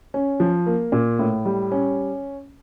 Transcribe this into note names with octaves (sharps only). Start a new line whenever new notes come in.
C#4
F3
A#3
A#2
A2
G3
C#4